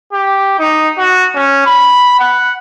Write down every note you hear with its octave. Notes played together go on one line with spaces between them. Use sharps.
G4
D#4
F#4
C#4
B5
F#5